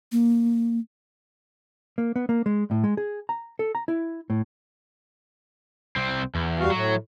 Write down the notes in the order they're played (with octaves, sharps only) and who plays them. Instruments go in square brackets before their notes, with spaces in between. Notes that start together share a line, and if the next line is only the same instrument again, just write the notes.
[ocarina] A#3
[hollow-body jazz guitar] A#3
B3
A#3
G#3
A2
G#3
G#4
A#5
A4
A#5
E4
A2
[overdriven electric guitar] C2 C4
E2
[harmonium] G3 F#4 F5
[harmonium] A2 [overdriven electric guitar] F#3